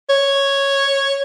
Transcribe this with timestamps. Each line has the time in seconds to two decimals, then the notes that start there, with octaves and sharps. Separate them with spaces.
0.09 C#5